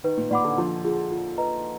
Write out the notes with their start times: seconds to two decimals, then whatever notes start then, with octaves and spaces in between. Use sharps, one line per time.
0.04 D#3 B4
0.18 A#2
0.30 A#2 D5 F#5 B5 D6
0.44 D3
0.58 F3 D4
0.85 F4 G#4
1.11 F4
1.38 B4 D#5 A#5